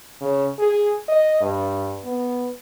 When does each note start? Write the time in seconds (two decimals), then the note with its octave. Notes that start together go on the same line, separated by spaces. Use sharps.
0.21 C#3
0.59 G#4
1.08 D#5
1.41 G2
2.05 B3